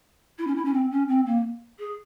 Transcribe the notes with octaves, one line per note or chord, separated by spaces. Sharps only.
E4
C#4
E4
C#4
C4
C#4
C4
A#3
G#4